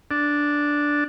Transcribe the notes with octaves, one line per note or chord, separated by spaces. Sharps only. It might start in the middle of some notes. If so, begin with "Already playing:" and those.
D4